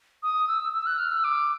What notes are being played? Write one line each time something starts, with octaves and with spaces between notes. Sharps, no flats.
D#6
E6
E6
F#6
F6
E6
D6